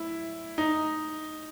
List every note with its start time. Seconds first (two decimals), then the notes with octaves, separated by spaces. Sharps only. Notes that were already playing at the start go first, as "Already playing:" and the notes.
Already playing: E4
0.58 D#4